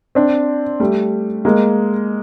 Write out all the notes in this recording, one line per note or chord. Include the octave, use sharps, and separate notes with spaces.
C4 D4
G3 A3
G#3 A#3